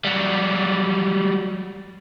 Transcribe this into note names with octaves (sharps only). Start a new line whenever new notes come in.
F#3 G3